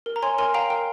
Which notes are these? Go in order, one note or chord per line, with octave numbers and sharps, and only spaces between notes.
A#4
A#5
C#5 G#5 C6
A#4 G#5 C6
F5 G5 A#5
A#4 G5